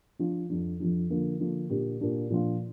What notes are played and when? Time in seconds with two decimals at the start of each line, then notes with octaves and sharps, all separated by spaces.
0.19 F3 D4 F4
0.50 F2 F3 D4
0.80 F2 F3 D4
1.10 D3 F3 A#3 D4
1.40 D3 F3 A#3 D4
1.70 A#2 A#3 D4 G4
2.01 A#2 A#3 D4 G4
2.30 A#2 F3 D4 F4